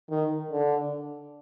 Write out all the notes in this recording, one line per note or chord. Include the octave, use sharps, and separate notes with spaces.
D#3
D3